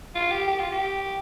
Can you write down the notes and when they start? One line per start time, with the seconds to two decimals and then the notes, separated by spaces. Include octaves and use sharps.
0.15 F4
0.31 G4
0.48 G4
0.60 F4
0.72 G4